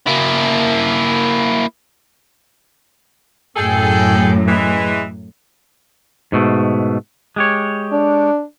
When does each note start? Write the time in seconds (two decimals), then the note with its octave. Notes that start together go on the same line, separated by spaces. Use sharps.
0.07 A#3 E4
3.56 F#2 A2 G#4 A4 G5
4.47 E3 G#3
6.32 G#2 B2 A3
7.36 G#3 G4 C#5
7.92 D4